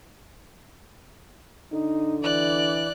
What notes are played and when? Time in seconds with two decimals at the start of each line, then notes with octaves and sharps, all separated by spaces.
1.72 D3 D#4
2.23 E3 D5 F#6